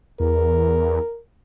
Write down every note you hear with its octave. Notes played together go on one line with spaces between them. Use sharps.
E2 A#4